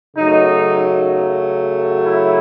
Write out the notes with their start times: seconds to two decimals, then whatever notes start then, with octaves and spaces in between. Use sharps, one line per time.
0.16 F#2 C#3 F#3 A3 D#4
2.06 E4